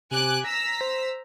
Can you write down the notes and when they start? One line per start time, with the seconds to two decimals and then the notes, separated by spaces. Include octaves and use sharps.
0.11 C3 G#5 D6 F#6
0.44 A#5 E6 A#6 B6
0.81 C5